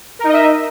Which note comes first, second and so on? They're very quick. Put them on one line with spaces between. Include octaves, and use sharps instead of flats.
A#4 D#4 D#5 E5